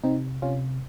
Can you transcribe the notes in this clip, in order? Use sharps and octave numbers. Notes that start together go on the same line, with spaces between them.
C3 C4 D#4
C3 C#4 F4